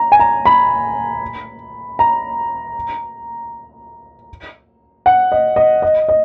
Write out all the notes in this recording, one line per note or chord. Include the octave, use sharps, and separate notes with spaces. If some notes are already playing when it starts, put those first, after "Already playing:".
Already playing: A#5
G#5
A#5
B5
A#5
F#5
D#5
D#5
D#5
D#5